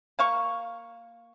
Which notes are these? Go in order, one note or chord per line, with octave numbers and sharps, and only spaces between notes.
A#3 F5 C#6